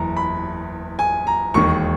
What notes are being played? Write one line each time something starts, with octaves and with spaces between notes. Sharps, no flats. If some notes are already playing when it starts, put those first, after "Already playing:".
Already playing: F#1 E2 A#5
B5
G#5
A#5
E1 D#2 D#3 C#6